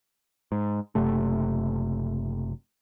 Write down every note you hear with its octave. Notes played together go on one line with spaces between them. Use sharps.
G#2
F#1 C3 A3